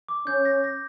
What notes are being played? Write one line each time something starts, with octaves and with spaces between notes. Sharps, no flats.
D6
C#4 G6
A#6
A#6